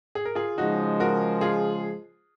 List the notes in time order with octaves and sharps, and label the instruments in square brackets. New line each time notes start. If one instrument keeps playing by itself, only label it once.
[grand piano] G#4
A#4
F4 G#4
[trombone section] C#3 F3 G#3 [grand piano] D#4 F#4
[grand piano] F#4 A#4
F4 G#4